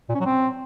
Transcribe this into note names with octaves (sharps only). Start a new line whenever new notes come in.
A#2
C#4
F#3
C4